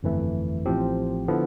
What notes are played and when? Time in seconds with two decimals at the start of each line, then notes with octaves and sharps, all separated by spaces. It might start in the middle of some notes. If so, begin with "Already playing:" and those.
0.03 G1 F2 E3 A3
0.66 A1 A2 F3 C4 G4
1.28 D3 F3 B3 E4